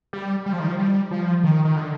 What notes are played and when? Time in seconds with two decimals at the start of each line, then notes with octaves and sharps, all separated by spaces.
0.13 G3
0.46 G3
0.53 F3
0.60 D#3
0.68 F3
0.78 G3
1.11 F3
1.43 D#3
1.65 D#3
1.76 D3